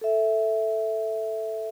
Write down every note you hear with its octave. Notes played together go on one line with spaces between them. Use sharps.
A4 E5